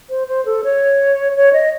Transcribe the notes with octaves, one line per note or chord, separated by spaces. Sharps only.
C5
C5
A4
C#5
C#5
D#5